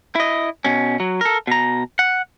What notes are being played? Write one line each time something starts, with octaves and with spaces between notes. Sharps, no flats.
E4 D#5
B2 C#4
F#3
A4 A#4
B2 A#5
F#5